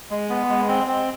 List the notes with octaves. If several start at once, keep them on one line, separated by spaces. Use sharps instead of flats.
G#3
B3
G#3
C4
C4